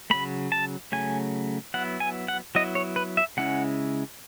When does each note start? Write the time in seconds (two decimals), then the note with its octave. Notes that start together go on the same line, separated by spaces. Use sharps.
0.10 C#3 F#3 A3 B5
0.52 A5
0.92 C#3 F#3 A3 G#5
1.74 F#3 B3 E4 F#5
2.00 G#5
2.28 F#5
2.55 F#3 B3 E4 D#5
2.75 C#5
2.96 B4
3.17 E5
3.37 C#3 G#3 C#4 E4 F#5